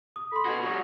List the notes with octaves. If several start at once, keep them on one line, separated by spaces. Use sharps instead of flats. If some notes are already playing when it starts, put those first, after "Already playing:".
D#6
A4 B5 C6
B2 F#4 G#5
G3 F#4 D#5 C#6